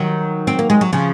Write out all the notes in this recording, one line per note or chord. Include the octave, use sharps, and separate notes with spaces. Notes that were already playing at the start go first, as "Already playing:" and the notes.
Already playing: D#3 F#3
C4
A#3
G#3
F#3
C#3 F3